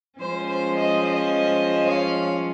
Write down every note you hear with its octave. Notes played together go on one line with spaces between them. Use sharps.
F3 G#3 C#4 C5
C5
C5 D#5
C5 D#5
C#5 F5